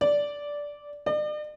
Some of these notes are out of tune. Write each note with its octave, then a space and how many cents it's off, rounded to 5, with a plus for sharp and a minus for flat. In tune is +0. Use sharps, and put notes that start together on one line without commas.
D5 -10
D5 +45